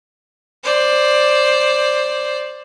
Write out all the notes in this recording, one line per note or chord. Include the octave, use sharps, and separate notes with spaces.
C5 D5